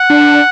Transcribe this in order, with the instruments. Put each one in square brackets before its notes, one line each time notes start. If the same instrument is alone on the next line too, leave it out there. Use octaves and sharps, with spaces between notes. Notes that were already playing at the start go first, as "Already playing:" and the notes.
Already playing: [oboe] F#5
[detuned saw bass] D4